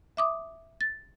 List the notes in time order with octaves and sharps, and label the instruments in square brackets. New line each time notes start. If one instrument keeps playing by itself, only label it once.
[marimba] E5 D6 D#6
A6